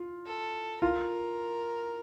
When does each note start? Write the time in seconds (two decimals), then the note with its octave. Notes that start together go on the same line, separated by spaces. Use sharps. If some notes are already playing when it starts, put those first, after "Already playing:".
Already playing: F4
0.26 A4
0.82 F4 A#4